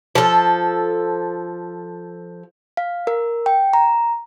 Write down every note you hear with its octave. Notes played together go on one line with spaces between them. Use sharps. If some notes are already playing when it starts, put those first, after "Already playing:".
F3 A4
F5
A#4
G5
A#5